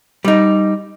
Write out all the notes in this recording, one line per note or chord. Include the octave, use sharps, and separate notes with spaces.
G3 D#4